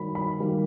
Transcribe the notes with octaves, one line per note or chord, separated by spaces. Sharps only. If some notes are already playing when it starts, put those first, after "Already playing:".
Already playing: D#3 G3 A#3 B5
B5
D#3 G3 A#3